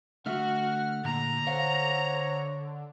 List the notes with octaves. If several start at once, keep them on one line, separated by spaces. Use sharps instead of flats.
D3 A3 F#4 E5 F#5 F6
A#2 D3 A#5
C5 C#5 F5 F#5